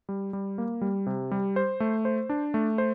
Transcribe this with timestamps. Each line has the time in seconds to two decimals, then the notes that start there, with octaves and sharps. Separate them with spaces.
0.09 G3
0.33 G3
0.58 A#3
0.81 G3
1.06 C3
1.31 G3
1.56 C5
1.80 A3
2.05 C5
2.29 D4
2.54 A3
2.78 C5